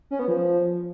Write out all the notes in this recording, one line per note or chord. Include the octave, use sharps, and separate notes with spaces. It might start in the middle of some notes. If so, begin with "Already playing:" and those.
C#4
B3
F3